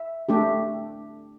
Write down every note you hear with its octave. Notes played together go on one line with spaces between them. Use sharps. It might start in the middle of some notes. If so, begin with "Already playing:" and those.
Already playing: E5
A3 D4 G4